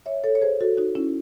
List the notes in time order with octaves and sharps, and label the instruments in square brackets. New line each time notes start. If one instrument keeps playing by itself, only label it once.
[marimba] C#5 E5
A4 C#5
C#5
G#4 C5
F#4 A4
D#4 F#4
C#4 E4